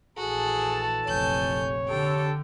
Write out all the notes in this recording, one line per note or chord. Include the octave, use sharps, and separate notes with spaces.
A#1 E3 F#4 G#4 A4 A5
F1 A#1 C#5 G#5 G6
D3 G4 A4 G5